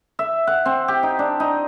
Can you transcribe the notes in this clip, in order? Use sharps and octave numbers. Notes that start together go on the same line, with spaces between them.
E5
F#5
C4
G4
D#4
D4
D#4